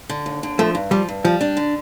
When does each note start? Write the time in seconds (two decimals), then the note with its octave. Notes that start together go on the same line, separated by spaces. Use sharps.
0.09 D3
0.26 D#2
0.43 D3
0.59 F3 A3
0.75 G2
0.91 F3 G3
1.09 G2
1.25 F3 G3
1.41 D4
1.57 D3